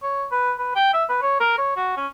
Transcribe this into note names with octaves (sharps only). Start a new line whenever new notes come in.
C#5
B4
B4
G5
E5
B4
C#5
A#4
C#5
F#4
C#4